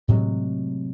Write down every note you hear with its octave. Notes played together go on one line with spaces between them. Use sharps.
A2 C3 F#3 G#3